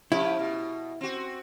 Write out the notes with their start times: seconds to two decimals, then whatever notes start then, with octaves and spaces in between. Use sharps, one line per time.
0.12 F3 C#4 E4 G4
0.39 B2
1.01 C4 F#4